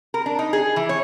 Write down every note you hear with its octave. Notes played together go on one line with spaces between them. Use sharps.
A#4
D4
D#4
G#4
E3
C#5